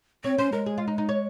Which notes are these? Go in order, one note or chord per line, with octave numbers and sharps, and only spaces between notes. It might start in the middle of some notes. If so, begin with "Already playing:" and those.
C4 C#5
C#4 C5
G#3 A#4
G#4
F4
D#4
D#4
C#5